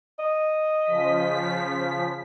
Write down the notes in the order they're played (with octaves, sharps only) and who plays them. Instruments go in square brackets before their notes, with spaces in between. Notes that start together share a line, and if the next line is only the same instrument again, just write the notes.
[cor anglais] D#5
[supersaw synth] C#3 F3 B6